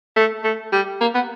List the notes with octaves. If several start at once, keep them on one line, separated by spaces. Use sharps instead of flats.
A3
A3
G3
A#3
B3